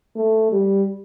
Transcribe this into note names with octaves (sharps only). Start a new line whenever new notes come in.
A3
G3